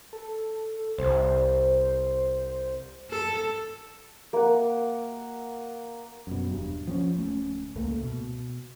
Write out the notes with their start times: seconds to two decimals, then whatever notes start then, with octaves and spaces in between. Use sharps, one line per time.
0.13 A4
0.98 C2 C5
3.11 A4
4.33 A#3 F#5
6.27 F#2 B2
6.51 E1 G2
6.87 F3 C4 C#4
7.16 D1 A3 C#4
7.76 C#2 G#2 A3 A#3
8.03 B2